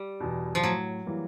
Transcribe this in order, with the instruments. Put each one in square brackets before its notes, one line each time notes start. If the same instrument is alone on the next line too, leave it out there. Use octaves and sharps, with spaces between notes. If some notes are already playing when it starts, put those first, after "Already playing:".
Already playing: [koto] G3
[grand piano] E2 B2
[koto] F3
[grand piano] A2 [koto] F#3
[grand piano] E3 G3 A#3